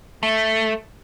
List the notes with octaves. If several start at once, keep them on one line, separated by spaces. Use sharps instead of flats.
A3